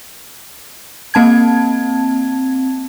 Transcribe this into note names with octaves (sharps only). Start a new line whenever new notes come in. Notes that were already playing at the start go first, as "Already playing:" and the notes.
A#3 C4 A5 G#6